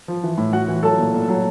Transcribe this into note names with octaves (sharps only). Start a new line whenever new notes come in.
F3
E3
A2
A2 F#4 F#5
E3
F#3 A4 A5
A#2
A#2
F#3